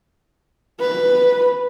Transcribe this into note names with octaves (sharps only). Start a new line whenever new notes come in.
B4